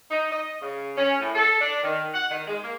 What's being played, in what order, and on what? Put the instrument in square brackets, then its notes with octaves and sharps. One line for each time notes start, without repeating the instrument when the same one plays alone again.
[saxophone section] D#4
D#5
C#3
C#4
A2
A4
D4
D#3
F#5
D#3
G#3
A#3